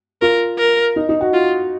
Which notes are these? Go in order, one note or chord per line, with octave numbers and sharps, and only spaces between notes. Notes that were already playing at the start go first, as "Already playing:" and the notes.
F4 A#4
A#4
D#4
D#4
F#4
F4